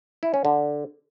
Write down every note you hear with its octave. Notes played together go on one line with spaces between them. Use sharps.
E4
C#4
D3